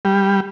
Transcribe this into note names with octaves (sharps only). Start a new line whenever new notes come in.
G3